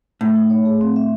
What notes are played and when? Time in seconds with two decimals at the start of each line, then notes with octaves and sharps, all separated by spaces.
0.21 A2 D#4
0.35 D#4
0.50 C#5
0.65 G#4
0.81 C4
0.96 E5